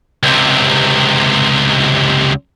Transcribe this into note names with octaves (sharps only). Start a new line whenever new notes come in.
C#2 C3